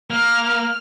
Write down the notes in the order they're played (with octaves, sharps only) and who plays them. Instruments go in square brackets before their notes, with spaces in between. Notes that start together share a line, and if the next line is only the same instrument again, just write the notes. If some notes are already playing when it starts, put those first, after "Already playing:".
[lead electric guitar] A#3 [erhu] F6